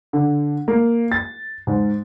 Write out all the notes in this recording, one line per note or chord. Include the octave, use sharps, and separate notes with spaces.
D3
A#3
A6
G#2